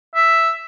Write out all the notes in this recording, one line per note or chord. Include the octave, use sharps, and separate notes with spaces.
E5